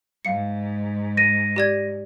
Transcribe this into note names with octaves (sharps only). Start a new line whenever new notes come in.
G#2 F5 C#7
A#6 D#7
G4 D5 G#6